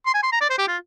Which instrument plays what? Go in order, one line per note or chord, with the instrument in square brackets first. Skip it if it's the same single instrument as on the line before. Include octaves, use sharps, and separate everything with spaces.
[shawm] C6
G#5
C6
A#5
D5
C5
G4
F4